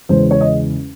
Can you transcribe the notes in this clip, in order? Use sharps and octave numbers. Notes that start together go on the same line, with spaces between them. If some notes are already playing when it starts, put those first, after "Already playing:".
E2 C#3 E3 G#3 C#4 C5
C#5
D#5